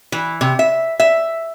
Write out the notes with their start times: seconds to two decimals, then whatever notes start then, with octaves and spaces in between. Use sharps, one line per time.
0.12 E3
0.41 C3
0.59 E5
1.00 E5